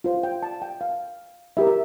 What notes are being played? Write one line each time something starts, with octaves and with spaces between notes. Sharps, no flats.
F4 C5
G5
A5
G5
F5
E4 G4 A#4 E5
E5